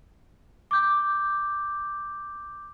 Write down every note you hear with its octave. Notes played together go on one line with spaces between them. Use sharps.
D6 G6